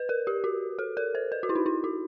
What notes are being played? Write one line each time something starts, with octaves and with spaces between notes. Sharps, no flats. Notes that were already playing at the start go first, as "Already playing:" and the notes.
Already playing: B4
A#4
G4
F#4
A4
A#4
C5
B4
F#4
E4
D#4
E4
F#4